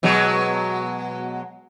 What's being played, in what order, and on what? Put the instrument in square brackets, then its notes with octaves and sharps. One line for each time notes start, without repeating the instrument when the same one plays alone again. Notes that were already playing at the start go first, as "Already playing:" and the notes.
[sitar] B2 F#3 G#3